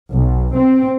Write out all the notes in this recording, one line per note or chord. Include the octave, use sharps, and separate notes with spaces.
B1
C4